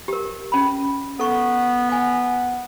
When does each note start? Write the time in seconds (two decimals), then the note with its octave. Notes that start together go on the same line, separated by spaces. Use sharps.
0.08 G4 A#4
0.52 C#4 B5
1.20 B3 A4 C#6
1.89 F#5 G#5